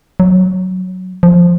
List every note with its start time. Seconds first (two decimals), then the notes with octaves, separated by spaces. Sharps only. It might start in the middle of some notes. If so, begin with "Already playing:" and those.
0.20 F#3
1.23 F3